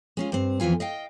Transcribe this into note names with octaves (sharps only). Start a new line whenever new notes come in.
G#3 C#4 F4
G2 C4
F2 E3 B3 F4 G#5
D#5 F5 G5